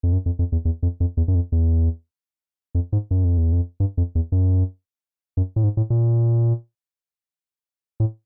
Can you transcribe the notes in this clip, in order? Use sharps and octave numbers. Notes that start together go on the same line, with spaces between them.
F2
F#2
F2
F2
E2
E2
F2
F2
E2
F#2
F2
E2
F2
G#2
F#2
F2
E2
F2
G2
F2
E2
F#2
F#2
A2
G#2
A2
A#2
A2